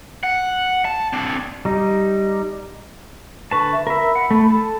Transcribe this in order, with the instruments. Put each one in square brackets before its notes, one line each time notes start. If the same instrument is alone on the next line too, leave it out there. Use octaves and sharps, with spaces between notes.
[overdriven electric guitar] F#5
A5
C4 D4
[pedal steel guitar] G3 D#4
[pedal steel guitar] D3 B4 A5 [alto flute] C#6
[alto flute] E5
[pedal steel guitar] A#4 E5 [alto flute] B5
[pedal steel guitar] F#5
A3
A4